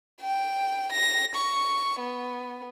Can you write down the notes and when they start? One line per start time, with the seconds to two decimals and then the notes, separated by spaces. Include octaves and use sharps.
0.21 G5
0.93 A#6
1.36 C#6
2.00 B3